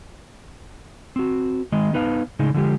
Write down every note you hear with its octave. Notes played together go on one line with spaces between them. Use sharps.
C4 F#4
D#3 G#3 D#5
B3 D#4 B4 D#5 F5
A2 C#3 G#3 D#4
D3 F3 G#3 G4